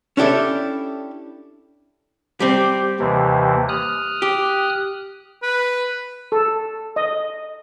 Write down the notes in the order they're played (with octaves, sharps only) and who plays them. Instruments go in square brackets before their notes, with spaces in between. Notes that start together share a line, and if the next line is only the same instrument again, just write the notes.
[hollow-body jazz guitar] C#4 D4 E4 G4 A4 E5
[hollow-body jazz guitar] G3 C4 [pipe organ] G4
[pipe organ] D#2 C3 E3
D#6 F6 F#6
[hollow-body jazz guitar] G4
[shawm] B4
[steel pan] A4
D#5